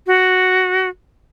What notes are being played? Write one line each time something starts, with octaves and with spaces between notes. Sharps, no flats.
F#4